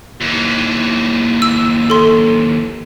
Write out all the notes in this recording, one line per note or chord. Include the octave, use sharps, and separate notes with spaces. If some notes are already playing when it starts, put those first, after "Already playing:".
D#2 E3
E6
A4 C6